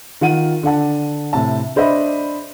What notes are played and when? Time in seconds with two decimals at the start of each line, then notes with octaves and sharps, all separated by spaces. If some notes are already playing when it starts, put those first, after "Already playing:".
0.21 D#3 F4 F#5 D#7
0.63 D3 D4 F#5 A5
1.33 A2 C3 A5
1.76 D4 C5 D#5 E5 B5